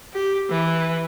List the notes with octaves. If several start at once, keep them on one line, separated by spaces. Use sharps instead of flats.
G4
E3